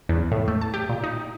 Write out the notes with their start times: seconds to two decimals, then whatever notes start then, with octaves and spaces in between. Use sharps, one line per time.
0.09 E2
0.32 A2
0.48 A3
0.61 A5
0.74 G4
0.89 A#2
1.04 D#4